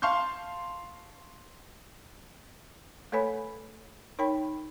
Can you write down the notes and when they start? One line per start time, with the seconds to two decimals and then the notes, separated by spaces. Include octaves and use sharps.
0.02 F5 A5 C6 C#6 G6
3.12 A3 A4 B4 C#5 G#5 B5
4.19 D#4 A#4 C#5 G5 B5